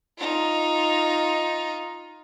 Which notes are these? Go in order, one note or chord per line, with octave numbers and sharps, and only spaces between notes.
D#4 F4